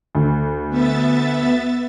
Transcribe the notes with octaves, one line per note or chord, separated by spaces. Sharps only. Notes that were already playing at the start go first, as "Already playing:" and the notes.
D2
B3 E5 A6